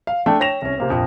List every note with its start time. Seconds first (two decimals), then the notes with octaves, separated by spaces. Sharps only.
0.07 F5
0.26 A3 D4 G5 A5
0.40 C#5 G5 A#6 E7 F7
0.62 C2 C#4
0.78 C3 A#3 C4
0.90 A#1 F2